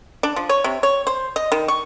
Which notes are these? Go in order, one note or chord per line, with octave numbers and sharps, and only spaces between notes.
D4
F3
C#5
C3
C#5
C5
D#5
D#3
C#6